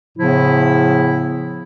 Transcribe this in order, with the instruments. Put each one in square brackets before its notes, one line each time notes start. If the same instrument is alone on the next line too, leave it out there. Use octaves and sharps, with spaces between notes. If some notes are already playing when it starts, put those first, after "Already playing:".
[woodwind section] A2 C#3 F3 B3 E4